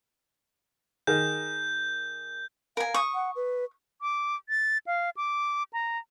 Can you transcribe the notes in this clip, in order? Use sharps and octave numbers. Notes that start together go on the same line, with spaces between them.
D#3 G#4 A#4 G6
A#4 F5 G#5
C#6 D#6
F#5
B4
D6
A6
F5
D6
A#5